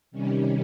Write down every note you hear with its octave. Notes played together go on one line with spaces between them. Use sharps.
C3 D#3 G3 C#4